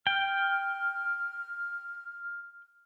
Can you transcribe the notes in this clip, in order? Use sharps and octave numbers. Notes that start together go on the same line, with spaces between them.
G5 F6